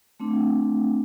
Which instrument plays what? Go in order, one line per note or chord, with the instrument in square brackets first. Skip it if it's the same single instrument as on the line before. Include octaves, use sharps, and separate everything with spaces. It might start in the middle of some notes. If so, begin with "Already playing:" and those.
[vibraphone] A3 C4 D4